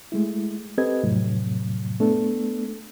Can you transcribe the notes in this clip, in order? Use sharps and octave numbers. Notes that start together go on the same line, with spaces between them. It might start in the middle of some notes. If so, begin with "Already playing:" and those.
G#3 A3 E4
C4 G4 A4 B4 D#5 G#6
F2 A2 C3 F#3
A3 B3 D4 A4